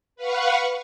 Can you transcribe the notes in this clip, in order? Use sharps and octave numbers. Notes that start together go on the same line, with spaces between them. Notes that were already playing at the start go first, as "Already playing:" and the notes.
B4 F5 F#5 C#6